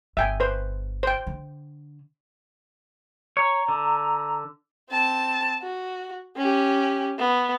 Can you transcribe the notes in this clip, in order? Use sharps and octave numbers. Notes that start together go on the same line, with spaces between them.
G1 E5 G5 G#5
B4 C5
C5 G5
D3
C#5 A#5
D3
C4 A5
F#4
C#4 G4
B3